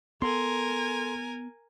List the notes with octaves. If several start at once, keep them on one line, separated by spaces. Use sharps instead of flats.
B3 A4 A#4 G#5 C6